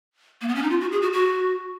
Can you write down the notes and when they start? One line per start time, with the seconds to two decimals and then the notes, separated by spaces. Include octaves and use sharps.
0.41 A#3
0.48 B3
0.55 C#4
0.63 D#4
0.70 F4
0.81 F#4
0.92 G#4
1.02 F#4
1.13 F#4